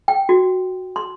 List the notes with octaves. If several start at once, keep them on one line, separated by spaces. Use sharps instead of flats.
G5
F#4
C6